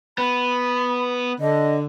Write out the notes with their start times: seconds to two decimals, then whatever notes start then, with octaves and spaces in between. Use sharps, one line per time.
0.18 B3 B5
1.41 D3 D#5